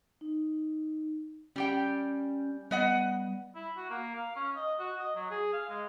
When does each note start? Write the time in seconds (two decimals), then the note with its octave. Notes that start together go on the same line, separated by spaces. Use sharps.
0.21 D#4
1.56 G3 C#4 G4 G5
2.71 G3 B3 D#5 F#5
3.55 E4
3.77 F#4
3.90 A#3
4.15 F5
4.36 C#4
4.56 D#5
4.79 F#4
4.99 D#5
5.16 F#3
5.31 G#4
5.53 F5
5.69 G#3